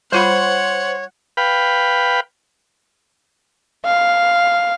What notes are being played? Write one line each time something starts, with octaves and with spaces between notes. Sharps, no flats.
G3 F4 C5 C#5 F#5 B5
B4 F5 G5 B5
F5